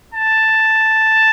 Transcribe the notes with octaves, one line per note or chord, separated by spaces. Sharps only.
A5